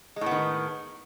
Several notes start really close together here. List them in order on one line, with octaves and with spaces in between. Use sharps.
G#3 A2 B3 D#3